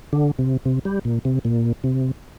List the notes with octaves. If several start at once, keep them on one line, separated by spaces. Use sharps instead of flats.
D3
C3
C3
G3
A#2
C3
A#2
C3